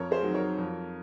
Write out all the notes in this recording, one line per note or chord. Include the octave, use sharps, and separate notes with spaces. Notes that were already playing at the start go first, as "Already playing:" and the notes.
Already playing: F2 A#4 C#5
G#4 C5
D#3 F#3
A#4 C#5
F2